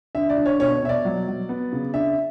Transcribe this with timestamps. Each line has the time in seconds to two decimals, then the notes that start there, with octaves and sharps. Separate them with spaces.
0.15 D3 E5
0.30 D5
0.37 D3
0.46 C#5
0.60 B2 C#5
0.82 B2 E5
0.89 D5
1.05 F#3
1.27 F#3
1.49 B3
1.72 C#3
1.94 D4 E5